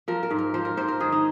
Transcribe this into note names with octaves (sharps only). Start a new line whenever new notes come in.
F3 A#4
A#4
G#2
A#4
F3 C5
A#4
G#2 C5
A#4
D#3 G#4
D#4